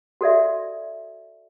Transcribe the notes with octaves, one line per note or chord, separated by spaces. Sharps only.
F#4 A4 D5 E5